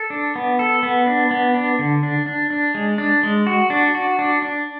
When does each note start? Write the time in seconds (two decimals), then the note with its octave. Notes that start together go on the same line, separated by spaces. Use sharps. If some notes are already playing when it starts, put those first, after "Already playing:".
Already playing: A4
0.10 D4
0.35 B3
0.59 A4
0.83 B3
1.06 D4
1.31 B3
1.54 D4
1.79 D3
2.03 D4
2.26 D4
2.50 D4
2.75 G#3
2.98 D4
3.23 G#3
3.47 F#4
3.70 D4
3.95 F#4
4.19 D4
4.42 D4